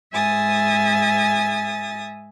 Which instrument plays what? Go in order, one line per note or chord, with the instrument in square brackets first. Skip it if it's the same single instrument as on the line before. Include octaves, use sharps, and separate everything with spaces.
[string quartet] G#2 E5 G#5 D#6 A6